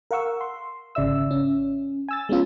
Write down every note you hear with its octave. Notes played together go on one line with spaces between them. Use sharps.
A#4 F5 F#5 C#6 E6
C6
G#1 C#3 D5 E5 E6
C#4
G#5 E6 A6
G#3 B3 C#4 F4